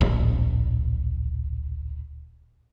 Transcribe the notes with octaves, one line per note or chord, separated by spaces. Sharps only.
D1 A#1